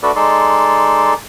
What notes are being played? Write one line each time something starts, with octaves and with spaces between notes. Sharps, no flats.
A3 D4 F#4 A4 B4 D5
G#3 D#4 A4 D5 C6